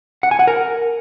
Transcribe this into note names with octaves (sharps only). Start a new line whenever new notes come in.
F#5
G#5
F#5
A#4